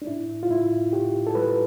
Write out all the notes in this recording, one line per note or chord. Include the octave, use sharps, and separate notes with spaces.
D4
A2 E4
F4
A2 E4
A2 G4
A4
G3 B4